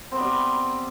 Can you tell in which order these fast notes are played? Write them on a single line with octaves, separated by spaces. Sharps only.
C4 B3 G3